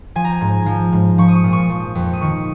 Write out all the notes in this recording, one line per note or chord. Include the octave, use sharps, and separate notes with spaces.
F3 G#5
A#5
G#5
G#2
F3
G#2
F3 C#6
D#6
C#6
A#2 D#6
C#6
F3
F2
D#6
D#3 C#6